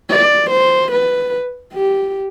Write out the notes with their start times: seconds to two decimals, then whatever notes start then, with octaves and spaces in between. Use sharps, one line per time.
0.10 D5
0.50 C5
0.92 B4
1.73 G4